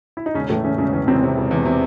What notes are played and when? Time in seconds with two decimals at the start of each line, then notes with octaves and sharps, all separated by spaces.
0.17 E4
0.26 D#4
0.34 E1 C#3 C#4
0.50 A2 E3 A3
0.64 C#3 E3 C#4
0.78 E1 C#3 C#4
0.93 C#3 E3 C#4
1.07 E1 C3 C4
1.23 C3
1.37 E1
1.51 E2
1.65 C3